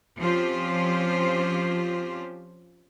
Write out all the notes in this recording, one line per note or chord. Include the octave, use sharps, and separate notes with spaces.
F3 C4 C#4 F4 G4 C5